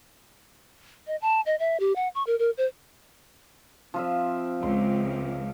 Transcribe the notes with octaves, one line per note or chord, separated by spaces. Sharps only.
D#5
A5
D#5
E5
G4
F#5
C#6
A#4
A#4
C5
F3 C4 F4 E5
C#2 C6